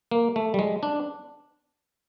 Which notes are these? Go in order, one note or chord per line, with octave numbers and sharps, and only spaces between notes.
A#3
A3
G3
G#3
D4